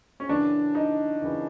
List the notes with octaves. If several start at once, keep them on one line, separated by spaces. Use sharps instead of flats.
C#4
F#2 C#3 E3 D4
D#4
F#2 C#3 E3